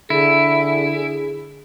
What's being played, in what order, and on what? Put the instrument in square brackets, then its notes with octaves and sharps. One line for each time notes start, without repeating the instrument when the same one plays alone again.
[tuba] D3 [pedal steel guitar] E4 [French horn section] G#4